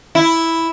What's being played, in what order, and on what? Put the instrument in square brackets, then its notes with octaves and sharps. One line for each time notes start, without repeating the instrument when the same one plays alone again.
[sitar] E4